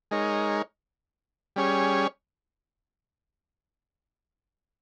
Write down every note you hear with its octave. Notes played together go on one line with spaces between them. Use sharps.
G#3 D#4 A#4 C#5
G3 C#4 G#4 C#5